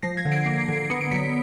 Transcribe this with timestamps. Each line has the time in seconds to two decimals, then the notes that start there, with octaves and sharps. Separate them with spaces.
0.03 F3 A#6 C7
0.17 G#6 A#6
0.25 D3
0.32 C7 D7
0.46 A#3
0.68 D3
0.90 B3 C#7
1.01 D7
1.11 F#3 B6 C#7